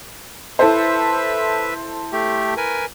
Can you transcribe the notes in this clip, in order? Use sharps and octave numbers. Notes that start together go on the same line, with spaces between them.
E4 A4 B4 C5 E5
A3 G4
A#4 B4 G#5